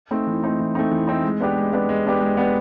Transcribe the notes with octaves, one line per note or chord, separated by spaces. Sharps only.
A3 C4 D#4
E3
A3 C4 D#4
E3
A3 C4 D#4
E3
A3 C4 D#4
G#3
B3 D4 G4 B4
G#3
B3 D4 G4 B4
G#3
B3 D4 G4 B4
G#3
B3 D4 G4 B4